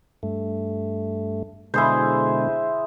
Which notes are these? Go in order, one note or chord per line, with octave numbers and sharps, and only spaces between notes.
G2 A3
B2 D3 G#3 E4 G#4 C5